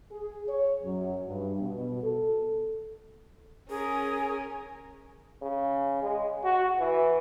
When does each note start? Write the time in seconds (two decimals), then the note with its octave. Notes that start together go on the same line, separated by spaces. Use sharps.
0.12 G#4
0.48 C#5
0.83 F#2
1.27 G2
1.60 B2
2.03 A4
3.70 C#4 G#4 A#4
5.41 C#3
6.03 G#3
6.44 F#4
6.79 E3